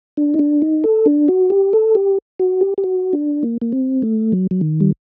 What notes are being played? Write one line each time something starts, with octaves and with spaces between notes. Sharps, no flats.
D4
D#4
D4
D#4
A4
D4
F#4
G4
A4
G4
F#4
G4
G4
F#4
D4
A#3
A#3
C4
A3
F#3
F#3
D#3
G3